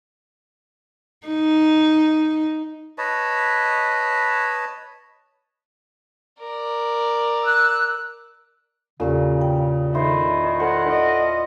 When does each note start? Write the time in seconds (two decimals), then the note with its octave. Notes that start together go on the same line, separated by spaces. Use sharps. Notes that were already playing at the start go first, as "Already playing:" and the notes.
1.27 D#4
2.98 B4 C#5 D#5 A5
6.39 A#4 D5
7.44 E6 F#6
9.00 E2 A#2 C#3 C#4 G4
9.41 G5
9.95 D#3 E4 C5
10.60 A4 A#4 C5 F#5
10.89 D#5